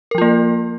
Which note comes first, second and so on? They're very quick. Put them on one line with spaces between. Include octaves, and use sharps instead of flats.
A#4 F3 F4 A#3